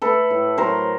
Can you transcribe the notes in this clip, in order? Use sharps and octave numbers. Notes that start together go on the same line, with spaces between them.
A3 A4 B4
A2
F#3 A#4 C5